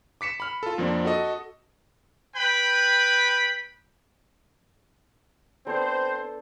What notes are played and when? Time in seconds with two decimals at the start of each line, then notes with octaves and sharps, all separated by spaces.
0.21 D6 B6 C#7 E7
0.40 B5 F6
0.63 F4 A4
0.78 F2 F3 A#3 C4 D4
1.05 F#4 A4 D#5
2.36 B4 G5 B5
5.67 B3 C4 D4 A4 C5